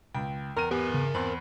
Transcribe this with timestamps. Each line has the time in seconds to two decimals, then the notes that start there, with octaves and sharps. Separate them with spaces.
0.15 C#2 G5
0.56 E2 A#4 D#7
0.71 B3 G4 A#4 G#5
0.94 C#3
1.14 E2 C4 B5